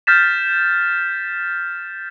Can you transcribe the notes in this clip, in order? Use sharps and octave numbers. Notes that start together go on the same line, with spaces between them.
F6 G6 A6 B6 E7